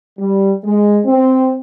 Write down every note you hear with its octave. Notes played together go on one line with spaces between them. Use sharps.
G3
G#3
C4